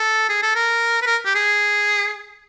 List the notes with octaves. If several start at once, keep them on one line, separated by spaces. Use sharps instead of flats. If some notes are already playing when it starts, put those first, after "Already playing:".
Already playing: A4
G#4
A4
A#4
B4
A#4
G4
G#4